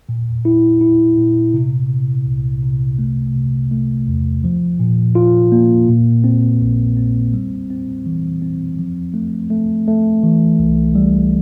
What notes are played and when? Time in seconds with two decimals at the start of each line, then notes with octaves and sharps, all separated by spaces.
0.09 A#2
0.45 E4
0.81 E4
1.17 A#2
1.54 C3
1.90 C3
2.26 C2
2.63 C3
2.99 A3
3.35 C3
3.71 A3
4.07 E2
4.44 F3
4.80 A#2
5.15 F4
5.52 A#3
5.89 A#2
6.24 C4
6.61 A#1
6.97 C4
7.33 G3
7.70 C4
8.06 E3
8.42 C4
8.79 F3
9.14 A3
9.50 A3
9.87 A3
10.23 E3
10.59 C2
10.95 G3